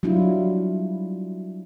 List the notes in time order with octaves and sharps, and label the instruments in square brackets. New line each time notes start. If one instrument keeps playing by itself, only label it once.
[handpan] F#3 G3 D4 E4 F4